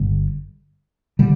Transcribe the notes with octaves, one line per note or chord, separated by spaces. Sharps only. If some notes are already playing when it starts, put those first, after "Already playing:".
Already playing: G1 D3 G3
D3 G3